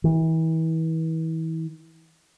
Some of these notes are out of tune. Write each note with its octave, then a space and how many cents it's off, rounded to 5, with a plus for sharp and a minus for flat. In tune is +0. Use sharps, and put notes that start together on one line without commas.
E3 -35